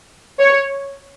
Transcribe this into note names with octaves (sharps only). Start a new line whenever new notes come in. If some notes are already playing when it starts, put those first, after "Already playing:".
C#5